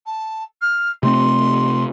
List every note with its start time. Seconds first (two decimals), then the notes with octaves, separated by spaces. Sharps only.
0.06 A5
0.61 F6
1.03 C3 A3 C4 C6